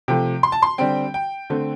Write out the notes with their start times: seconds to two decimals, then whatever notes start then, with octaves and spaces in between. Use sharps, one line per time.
0.08 C3 F3 A3 G5
0.43 C6
0.52 A5
0.62 C6
0.78 D3 G3 C4 G5
1.14 G5
1.50 D3 A3 C4